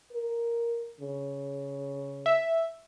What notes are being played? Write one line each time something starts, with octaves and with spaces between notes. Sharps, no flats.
A#4
C#3
E5